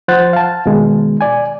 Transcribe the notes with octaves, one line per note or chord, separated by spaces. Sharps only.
F3 C5 F#5 F#6 A6
F5 A5
B2 D#3 G#3
D5 G#5